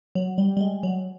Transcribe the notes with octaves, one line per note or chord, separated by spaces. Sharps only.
F#3
G3
G3
G#3
F#3